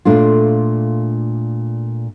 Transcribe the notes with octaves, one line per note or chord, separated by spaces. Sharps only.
A#2 A3 D4 F4